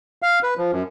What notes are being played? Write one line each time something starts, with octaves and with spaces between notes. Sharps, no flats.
F5
B4
F3
F#2